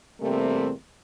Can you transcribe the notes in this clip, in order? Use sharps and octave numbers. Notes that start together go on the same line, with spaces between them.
E2 C3 G3 A3 A#3 C4